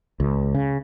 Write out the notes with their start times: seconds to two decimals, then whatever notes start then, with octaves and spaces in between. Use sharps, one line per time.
0.20 C#2
0.55 C#3